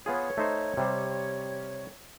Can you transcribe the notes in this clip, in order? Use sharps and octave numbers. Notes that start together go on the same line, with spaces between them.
B3 F4 G#4 C#5
A3 D#4 C5
C3 G3 C5